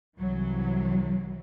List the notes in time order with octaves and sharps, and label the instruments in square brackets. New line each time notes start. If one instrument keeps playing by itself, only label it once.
[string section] C2 E3 F#3